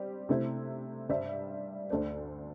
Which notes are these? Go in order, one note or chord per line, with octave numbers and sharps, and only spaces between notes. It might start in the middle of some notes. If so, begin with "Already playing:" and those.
Already playing: G3 C4 G4
C3 A3 E4 C5
G2 G3 D4 C5 E5
D2 D3 A3 D4 C5